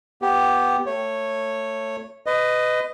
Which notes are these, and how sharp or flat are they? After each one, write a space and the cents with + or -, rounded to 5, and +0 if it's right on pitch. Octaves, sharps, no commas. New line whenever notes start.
B3 +0 G4 +0
A3 +15 C#5 -10
B4 +30 D#5 -5